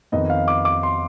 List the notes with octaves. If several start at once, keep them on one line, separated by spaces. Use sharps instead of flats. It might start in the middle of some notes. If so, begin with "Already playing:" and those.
F2 D#3 B3 D#4 D#5
F5
D6
D6
C6